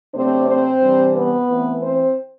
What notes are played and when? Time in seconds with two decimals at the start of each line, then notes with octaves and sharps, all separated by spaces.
0.14 C3 F#3 A3 C4 D4 C5
0.47 C4 C5
0.81 C3 E3 G3 D4
1.14 B3 B4
1.48 E3 A3 C4
1.81 C4 C5